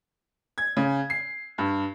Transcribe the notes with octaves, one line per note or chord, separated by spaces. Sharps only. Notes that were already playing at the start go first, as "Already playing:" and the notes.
G#6
C#3
C7
G2